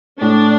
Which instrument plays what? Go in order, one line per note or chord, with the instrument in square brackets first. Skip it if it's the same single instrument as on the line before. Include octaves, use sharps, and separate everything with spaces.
[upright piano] A2 [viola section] D4